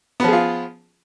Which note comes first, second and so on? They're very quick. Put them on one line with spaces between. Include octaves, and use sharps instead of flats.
B3 F3 G#4 F4